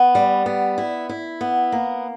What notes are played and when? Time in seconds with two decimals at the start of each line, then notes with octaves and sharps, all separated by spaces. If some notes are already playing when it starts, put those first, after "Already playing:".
Already playing: B3
0.15 G3
0.46 B3
0.78 E4
1.09 E4
1.41 B3
1.72 A#3